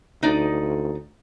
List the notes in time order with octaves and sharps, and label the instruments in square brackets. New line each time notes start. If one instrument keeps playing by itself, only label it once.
[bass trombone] D2 [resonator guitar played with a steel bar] D#4 D5 D#5